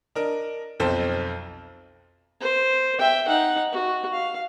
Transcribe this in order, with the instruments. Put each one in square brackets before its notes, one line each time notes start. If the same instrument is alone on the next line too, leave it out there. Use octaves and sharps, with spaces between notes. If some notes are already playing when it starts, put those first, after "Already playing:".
[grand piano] D4 A#4 D#5
B1 F2 A4 C5
[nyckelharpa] C5
E5 G5
D#4 F#5
F#4
F5